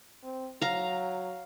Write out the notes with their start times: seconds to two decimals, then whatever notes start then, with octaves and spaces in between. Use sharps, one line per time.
0.23 C4
0.62 F#3 F5 A#5